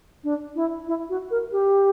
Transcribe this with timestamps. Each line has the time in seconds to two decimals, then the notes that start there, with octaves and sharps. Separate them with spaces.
0.24 D4
0.56 E4
0.88 E4
1.10 F#4
1.31 A#4
1.52 G4